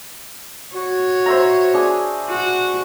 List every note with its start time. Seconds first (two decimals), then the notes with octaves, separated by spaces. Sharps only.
0.75 F#4 C#5
1.26 C5 E5 A#5
1.74 D4 G#4
2.29 F#4